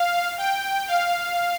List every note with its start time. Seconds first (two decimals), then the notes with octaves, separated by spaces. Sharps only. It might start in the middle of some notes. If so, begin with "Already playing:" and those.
Already playing: F5
0.38 G5
0.87 F5